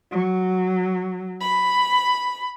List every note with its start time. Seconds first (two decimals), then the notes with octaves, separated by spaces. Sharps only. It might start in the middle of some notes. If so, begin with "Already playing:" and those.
0.11 F#3
1.40 B5